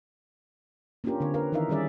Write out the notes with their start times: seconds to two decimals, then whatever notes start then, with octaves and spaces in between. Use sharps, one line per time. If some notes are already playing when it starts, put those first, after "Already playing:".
1.04 A#3 C#4 D4 F4 G4 A#4
1.20 D3 C4 C#5
1.34 A#4 B4 F5
1.52 D#3 E3 D#4 A#4 E5 F5
1.69 D#3 G3 C#4 G#4 D5 E5